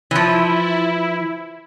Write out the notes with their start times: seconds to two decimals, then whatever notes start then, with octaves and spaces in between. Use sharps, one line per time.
0.11 E3 F3 E4